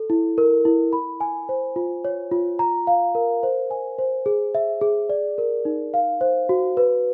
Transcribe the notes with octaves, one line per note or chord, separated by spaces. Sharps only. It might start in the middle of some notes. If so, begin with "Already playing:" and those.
Already playing: A4
E4
A#4
E4
B5
G#5
C5
F4
C#5
F4
A#5
F5
A#4
C5
G#5
C5
G#4
E5
G#4
D5
A#4
D#4
F5
C5
F#4
B4